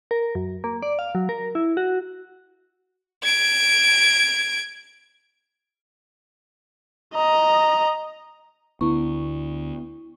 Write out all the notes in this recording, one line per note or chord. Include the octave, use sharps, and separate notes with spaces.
A#4
F#2
A#3
D5
F5
F#3
A#4
E4
F#4
G#6 D7
D#5 A#5
D2 D3 B3 E4 C#6